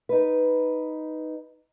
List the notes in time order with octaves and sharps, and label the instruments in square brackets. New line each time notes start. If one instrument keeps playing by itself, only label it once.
[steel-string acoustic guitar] D#4 B4